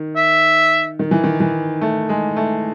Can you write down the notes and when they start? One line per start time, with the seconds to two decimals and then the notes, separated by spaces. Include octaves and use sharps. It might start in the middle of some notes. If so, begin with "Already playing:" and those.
Already playing: D#3
0.16 E5
0.99 D#3
1.11 E3
1.24 D#3
1.40 E3
1.81 A3
2.09 G#3
2.36 A3